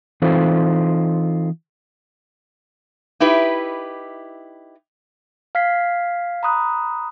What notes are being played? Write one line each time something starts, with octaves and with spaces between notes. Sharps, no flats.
E3 C4 D#4 F4 A4 C5
D#4 E4 G4 B4
F5 F6 G#6 B6 C7
A#5 B5 D#6 F#6